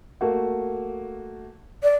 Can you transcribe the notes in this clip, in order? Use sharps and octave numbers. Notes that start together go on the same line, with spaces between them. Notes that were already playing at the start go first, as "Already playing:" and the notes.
A3 A#3 F#4
D5